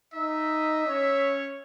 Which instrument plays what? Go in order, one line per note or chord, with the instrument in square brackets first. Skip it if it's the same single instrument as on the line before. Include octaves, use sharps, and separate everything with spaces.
[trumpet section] D#4 D#5 [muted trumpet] E5
[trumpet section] C#4 C#5